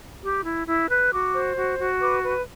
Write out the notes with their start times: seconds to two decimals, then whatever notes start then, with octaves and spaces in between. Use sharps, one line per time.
0.23 G4
0.45 E4
0.68 E4
0.90 B4
1.12 F#4 D6
1.34 C5
1.56 F#4
1.79 F#4
2.01 B4 D6
2.24 B4